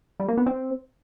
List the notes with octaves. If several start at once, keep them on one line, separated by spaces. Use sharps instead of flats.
G3
A#3
B3
C4